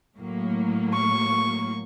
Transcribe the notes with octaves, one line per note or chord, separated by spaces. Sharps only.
A2 F#3 A#3
C#6